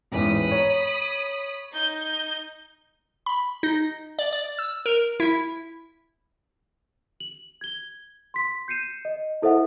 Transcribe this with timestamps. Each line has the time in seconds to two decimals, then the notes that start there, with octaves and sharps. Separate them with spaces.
0.12 A1 E2 G#2 B5 D#6
0.51 C#5 A#5
1.72 D#4 G6
3.26 B5
3.63 D#4
4.19 D5
4.33 D5
4.59 E6
4.86 A#4
5.20 E4
7.20 F#7
7.61 G#6 G7
8.34 C6 B6
8.68 G6 C7 C#7 D#7 E7
9.05 D#5
9.42 E4 A4 C5 E5 F#5